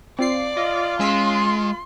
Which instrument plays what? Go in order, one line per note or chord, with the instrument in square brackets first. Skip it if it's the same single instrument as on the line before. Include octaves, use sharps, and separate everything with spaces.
[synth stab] C4 F4 C7 [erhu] D5
[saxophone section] F4 [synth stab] D#5
[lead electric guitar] G#3 [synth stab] C#4 E6 B6 [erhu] C6